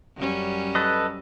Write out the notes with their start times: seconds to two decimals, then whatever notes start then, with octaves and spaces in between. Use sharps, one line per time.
0.16 F#2 G3 C#4
0.75 A4 B4 D#5